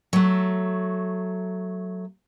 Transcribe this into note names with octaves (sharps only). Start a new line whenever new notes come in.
F#3 A3